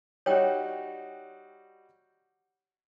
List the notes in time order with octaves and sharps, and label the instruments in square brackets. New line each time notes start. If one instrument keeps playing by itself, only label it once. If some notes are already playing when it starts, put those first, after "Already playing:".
[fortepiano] G3 D#4 F#4 [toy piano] C#5 G5